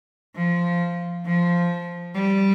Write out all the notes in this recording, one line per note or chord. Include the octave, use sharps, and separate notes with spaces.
F3
F3
G3